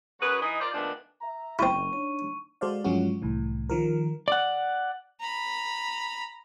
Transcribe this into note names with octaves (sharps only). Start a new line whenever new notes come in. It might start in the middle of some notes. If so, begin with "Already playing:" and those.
F#2 F#3 F#4 G#4 B4
E3 D#4 D#5
F4 A#4 C5 D5
A#2 D#3 F3 A3 B3 D4
E5 A#5
F#1 C4 E4 C#6 D#7
D4 D#4 C#5 D#7
G#3 F#4 A4 C5 D5 F5
G2 F3 F#3 G#3 C#4 F#4
C2 A2 E3
D#3 F3 A#4
D5 F#5
A#5 B5